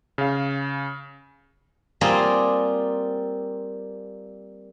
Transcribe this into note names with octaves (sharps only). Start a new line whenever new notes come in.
C#3 F5
G3 A#3 C4 F4 G#4 D5